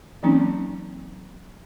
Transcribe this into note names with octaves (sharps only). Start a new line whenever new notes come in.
E3 F#3 A#3 C4 C#4 D#4